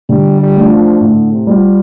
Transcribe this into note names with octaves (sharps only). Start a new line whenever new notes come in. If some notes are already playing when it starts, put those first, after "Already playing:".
D3 G3
G3
A3 D4 F4
F3
A2 D3
C3
G3 F4